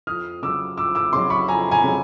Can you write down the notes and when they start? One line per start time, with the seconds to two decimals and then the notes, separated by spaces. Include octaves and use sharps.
0.07 F2 D#6 F6
0.42 C#3 F#3 D6 E6
0.77 F2 D6 E6
0.95 D6 E6
1.13 C#3 F#3 C6 D6
1.30 B5 C#6
1.48 F2 G#5 A#5
1.71 G#5 A#5
1.83 C#3 F#3